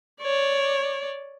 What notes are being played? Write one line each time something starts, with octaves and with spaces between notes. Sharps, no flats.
C#5 D5